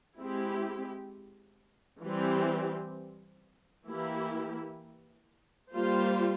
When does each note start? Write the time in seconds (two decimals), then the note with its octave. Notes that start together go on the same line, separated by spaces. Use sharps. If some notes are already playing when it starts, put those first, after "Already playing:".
0.18 G#3 C4 E4 G4
2.03 E3 G3 C4 G4
3.88 E3 A#3 E4 G4
5.74 G3 A#3 F4 C5